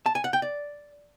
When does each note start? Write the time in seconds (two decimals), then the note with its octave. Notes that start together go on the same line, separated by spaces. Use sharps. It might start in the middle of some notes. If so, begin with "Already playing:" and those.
0.06 A5
0.15 G#5
0.24 F#5
0.33 G5
0.42 D5